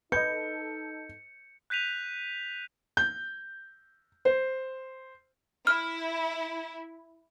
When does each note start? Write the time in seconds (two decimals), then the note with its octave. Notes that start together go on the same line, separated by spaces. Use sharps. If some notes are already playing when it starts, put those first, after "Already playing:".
0.12 D#4 A4 B4 D#5 G6 C#7
1.70 F#6 G6 B6 D#7 F7
2.97 G6
4.25 C5
5.67 E4 F6